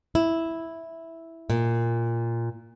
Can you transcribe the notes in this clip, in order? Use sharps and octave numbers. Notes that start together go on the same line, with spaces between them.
E4
A#2